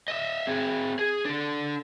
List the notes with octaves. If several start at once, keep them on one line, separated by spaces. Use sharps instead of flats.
D#5 E5
C4 G#4
G#4
D4 A4